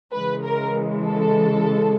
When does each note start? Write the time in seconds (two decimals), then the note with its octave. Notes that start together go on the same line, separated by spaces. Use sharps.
0.13 C#3 E3 G#3 B4
0.44 A#4
1.06 A4